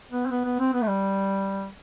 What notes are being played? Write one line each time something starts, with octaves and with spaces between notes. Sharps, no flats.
B3
C4
B3
B3
C4
B3
A3
G3